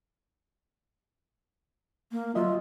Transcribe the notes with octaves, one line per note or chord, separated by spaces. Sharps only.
A#3
F#3 F4 D#5 E5